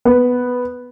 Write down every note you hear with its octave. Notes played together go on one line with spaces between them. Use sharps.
B3